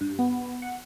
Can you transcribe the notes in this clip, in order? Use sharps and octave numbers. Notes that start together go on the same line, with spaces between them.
G2
B3
F#5